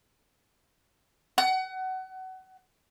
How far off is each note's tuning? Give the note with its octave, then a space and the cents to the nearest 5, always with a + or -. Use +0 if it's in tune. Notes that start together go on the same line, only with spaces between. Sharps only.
F#5 +25